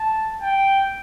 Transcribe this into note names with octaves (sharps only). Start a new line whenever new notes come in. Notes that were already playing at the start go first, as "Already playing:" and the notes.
Already playing: A5
G5